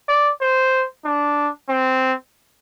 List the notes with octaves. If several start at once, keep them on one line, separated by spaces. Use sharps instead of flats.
D5
C5
D4
C4